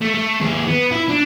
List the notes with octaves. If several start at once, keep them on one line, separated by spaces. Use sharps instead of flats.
A3
A3
D#2 G#4
B3
E4
D4